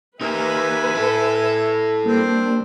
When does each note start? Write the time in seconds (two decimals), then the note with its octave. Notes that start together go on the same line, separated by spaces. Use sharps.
0.21 D#4 G4 A#4 B4 E5 G#5
0.95 E4 A4
2.05 G3 A#3 C4 D4